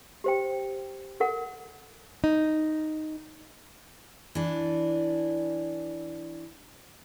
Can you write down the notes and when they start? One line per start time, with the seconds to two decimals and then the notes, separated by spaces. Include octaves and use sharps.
0.24 G4 C5 G5
1.20 A4 A#4 F#5
2.24 D#4
4.35 E3 D4